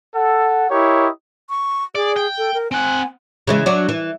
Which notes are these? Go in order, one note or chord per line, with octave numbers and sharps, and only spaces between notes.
A4 F#5
E4 G4 A#4 C#5 D#5
C#6
G#4 D5
G5
A4
A#4
C4 F#5 G#5
C#3 E3 G#3
F#3 D4
E3